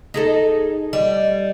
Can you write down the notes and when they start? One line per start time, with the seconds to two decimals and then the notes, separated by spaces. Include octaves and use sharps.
0.14 D#4 G#4 A4
0.93 G3 D#5